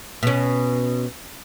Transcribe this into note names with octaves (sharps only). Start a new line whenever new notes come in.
B2 C#4